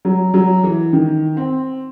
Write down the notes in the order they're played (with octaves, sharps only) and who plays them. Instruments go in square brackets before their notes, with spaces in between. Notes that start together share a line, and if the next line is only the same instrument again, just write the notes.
[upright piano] F#3
F#3
E3
D#3
C4